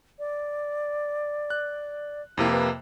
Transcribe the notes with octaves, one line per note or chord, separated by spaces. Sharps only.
D5
F#6
F2 C3 A#3 E4
B4